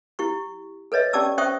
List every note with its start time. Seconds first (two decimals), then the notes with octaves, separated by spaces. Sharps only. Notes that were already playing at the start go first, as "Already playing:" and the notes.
0.19 E4 G4 C#6
0.92 A4 B4 C#5 D#5 E5
1.13 C#4 G4 D5 A5 D6 E6
1.38 C#4 C5 E5 G5 C#6 D#6